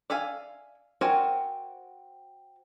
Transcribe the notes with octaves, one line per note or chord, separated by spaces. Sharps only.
D5 E5 F5 G#5
C4 F#4 A#4 D5 G#5